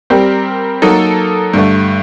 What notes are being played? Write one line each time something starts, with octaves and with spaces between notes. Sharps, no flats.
G3 C4 G4 A#4
F#3 A#3 D#4 A4
G2 D3 A3